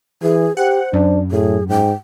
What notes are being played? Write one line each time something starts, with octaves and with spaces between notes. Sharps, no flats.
E3 G#4
G4 C5 F#5
F#2 D4
A2 G#4
G#2 G5